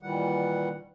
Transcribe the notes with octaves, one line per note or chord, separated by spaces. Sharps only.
A#2 D#3 E3 G3 F#5